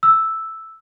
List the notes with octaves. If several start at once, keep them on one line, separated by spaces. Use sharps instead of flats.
E6